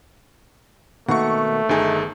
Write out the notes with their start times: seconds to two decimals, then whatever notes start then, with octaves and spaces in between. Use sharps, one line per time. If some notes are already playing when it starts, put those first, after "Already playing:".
1.09 B2 D#3 A3 A#3 F#5 C#6
1.69 G1 D#3 D#4 G#4